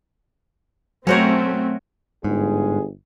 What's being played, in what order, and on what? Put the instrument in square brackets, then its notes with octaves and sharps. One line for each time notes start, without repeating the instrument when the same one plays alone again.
[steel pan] F#3 C5 C#5 [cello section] A3 [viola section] C4 [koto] C#4 F#4 A#4
[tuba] G1 [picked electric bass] G#2 [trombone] G#4